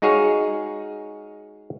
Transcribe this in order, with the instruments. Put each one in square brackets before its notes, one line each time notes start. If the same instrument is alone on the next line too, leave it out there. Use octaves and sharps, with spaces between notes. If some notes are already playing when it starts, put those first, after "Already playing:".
[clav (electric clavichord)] G#3 D#4 F#4 G#4 C#5 F5